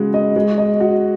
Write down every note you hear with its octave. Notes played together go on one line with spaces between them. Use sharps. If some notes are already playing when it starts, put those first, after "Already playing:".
Already playing: C#3 G#3 F#4
D#5
G#3
D#5
F#4